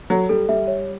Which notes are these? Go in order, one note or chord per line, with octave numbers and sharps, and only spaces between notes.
F#3 A4
G3 A4
G3 E5
C#5